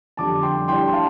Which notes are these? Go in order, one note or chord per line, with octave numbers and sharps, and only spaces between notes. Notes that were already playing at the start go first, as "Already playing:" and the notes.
F2 D3 G3 A5 D6
G5 C6
A2 G3 D4 G5 C6
C6
F5 A5